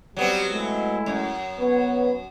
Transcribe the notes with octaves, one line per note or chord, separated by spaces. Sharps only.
F#3 G3 B3 C4
G#3 A3 E4
F#2
B3 B4 C#5